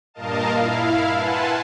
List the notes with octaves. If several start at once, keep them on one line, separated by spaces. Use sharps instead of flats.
G2 A#2 A#4 D#5 F5 A5
E4 F5
B4 F#5 G#5 A5 C6